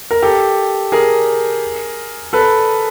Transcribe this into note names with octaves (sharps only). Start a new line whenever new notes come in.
A#4
G4 A4
G#4 A#4
A4 B4